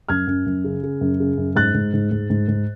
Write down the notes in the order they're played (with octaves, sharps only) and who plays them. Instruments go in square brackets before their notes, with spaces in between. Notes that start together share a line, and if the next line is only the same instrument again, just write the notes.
[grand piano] F#2 F6 G#6
F#2
F#2
C#3
C#3
F#2
C#3
F#2
G#2 F#6 A6
G#2
G#2
G#2
G#2
G#2